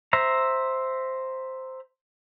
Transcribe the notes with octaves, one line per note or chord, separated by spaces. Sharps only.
C5 E5 A#5